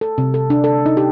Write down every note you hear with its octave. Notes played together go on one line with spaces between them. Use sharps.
A4
C3
A4
D4
A4
D#4
G4